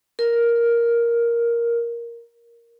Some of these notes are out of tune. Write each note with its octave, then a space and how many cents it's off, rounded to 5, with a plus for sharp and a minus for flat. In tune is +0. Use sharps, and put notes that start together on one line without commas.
A#4 +5